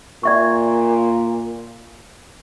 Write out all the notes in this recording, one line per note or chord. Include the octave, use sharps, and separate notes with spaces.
A#2 D5 E5 C#6